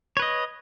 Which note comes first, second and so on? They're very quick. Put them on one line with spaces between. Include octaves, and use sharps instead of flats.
C#5 B4 D#5